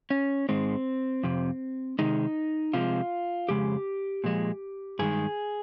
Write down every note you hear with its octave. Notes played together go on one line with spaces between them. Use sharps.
C#4
G#2 D#3 G#3 C4
F2 C3
C3 D#3 G#3 D#4
C3 F3 G#3 F4
F2 C#3 G#3 G4
A#2 F3 G#3
G2 D#3 G#3 G#4